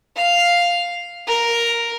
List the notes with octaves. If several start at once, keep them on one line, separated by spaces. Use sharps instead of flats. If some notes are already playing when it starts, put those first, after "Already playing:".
F5
A#4